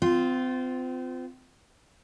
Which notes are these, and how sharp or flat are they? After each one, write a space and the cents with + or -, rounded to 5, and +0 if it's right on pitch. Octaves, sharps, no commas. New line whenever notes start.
C4 -35 F4 +0